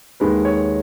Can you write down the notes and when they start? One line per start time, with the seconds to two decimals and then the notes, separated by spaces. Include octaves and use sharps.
0.20 D#2 D#3 G#3 B4
0.45 C#5